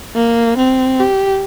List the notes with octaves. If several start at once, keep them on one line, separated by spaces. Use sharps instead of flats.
A#3
C4
G4